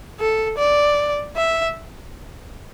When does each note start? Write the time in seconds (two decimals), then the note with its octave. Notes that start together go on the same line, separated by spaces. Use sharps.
0.20 A4
0.58 D5
1.37 E5